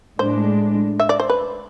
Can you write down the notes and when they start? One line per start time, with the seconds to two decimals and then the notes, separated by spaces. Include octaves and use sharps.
0.19 A2 G#3 D4 C5
1.00 E5
1.09 D5
1.20 C5
1.29 B4